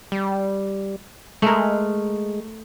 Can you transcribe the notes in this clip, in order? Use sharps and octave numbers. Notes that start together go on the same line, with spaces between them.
G3
G#3 A3 A#4